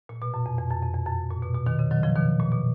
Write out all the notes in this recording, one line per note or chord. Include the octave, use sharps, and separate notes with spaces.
A#2
B2
F#2
F2
F2
F#2
F2
F2
F#2
A#2
B2
B2
B2 D#3
C#3
D#3 F#3
C#3 F3
B2 D#3
A#2
B2